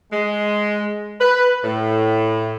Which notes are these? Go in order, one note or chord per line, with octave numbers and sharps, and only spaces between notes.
G#3
B4
A2